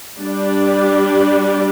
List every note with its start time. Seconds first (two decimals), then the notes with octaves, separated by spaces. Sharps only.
0.20 G3 D4 G4 D5